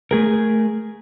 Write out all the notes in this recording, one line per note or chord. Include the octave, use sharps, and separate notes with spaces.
A3 G#4 A#4